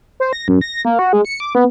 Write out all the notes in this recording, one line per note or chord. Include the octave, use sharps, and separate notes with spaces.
C5
A#6
F#2
A#6
A#3
F#4
G#3
C#7
D6
B3